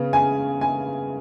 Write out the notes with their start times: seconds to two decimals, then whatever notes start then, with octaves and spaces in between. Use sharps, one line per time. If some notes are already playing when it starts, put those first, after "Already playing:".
Already playing: C#3 B3
0.13 G#5
0.61 G#5